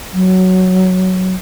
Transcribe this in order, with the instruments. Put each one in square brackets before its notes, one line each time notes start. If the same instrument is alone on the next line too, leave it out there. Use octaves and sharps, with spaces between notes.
[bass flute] F#3